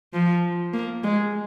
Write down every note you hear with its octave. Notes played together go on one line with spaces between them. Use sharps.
F3
A#3
G#3